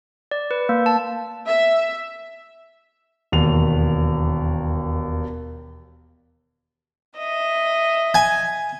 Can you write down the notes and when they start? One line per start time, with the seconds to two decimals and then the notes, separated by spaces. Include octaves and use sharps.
0.31 D5
0.51 B4
0.69 A#3
0.86 A5
1.47 E5
3.32 E1 D#2 F7
7.18 D#5 E5
8.14 G#5